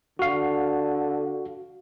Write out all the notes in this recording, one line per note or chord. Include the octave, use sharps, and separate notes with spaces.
D3 F#4 F5